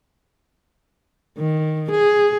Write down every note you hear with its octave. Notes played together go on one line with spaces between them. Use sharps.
D#3
G#4